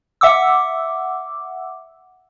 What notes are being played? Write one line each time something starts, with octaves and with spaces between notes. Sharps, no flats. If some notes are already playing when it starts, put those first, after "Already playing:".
E5 F#5 D6 E6